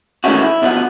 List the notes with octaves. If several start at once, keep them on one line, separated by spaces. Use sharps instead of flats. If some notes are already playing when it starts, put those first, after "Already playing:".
D#3 E3 G#3 A3 C#4 F#4
E4
B1 B2 F3 D#4 F#5